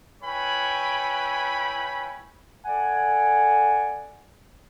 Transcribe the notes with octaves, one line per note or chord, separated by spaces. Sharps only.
E4 B4 C#5 G5 G#5 B5
A4 D5 F#5 G#5